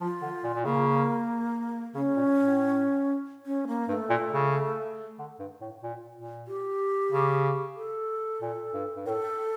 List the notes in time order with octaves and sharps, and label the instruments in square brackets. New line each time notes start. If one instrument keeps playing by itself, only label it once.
[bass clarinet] F3 [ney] F4
[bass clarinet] D3
A#2
A#2
[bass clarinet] C#3 [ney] A#3
[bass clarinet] C#3 [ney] C#4
[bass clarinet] A#2
A2
[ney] C#4
A#3
[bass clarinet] G2 [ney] A#3
[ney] A3
[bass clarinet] A#2
C#3
D3
G2
A2
A#2
A#2
[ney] G4
[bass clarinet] C#3
[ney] A4
[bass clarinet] A#2
G2
G2
[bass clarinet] A2 [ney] A#4
[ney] A4